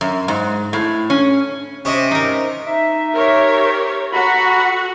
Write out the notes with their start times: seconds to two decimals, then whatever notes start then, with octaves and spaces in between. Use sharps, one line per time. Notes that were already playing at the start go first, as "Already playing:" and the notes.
0.01 F#2
0.28 G#2
0.73 A2
1.10 C#4
1.85 C3 C#4 D#5 E5
2.11 D#4 A#4
2.66 D#4 E5
3.15 G4 A#4 C#5
4.13 F#4 A4 F#5 A#5 B5